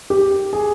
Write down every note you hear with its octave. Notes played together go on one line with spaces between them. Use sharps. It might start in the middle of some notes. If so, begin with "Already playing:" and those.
G4
G#4